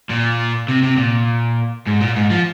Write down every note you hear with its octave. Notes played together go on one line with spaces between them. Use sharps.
A#2
C3
C3
A#2
G#2
A#2
G#2
F3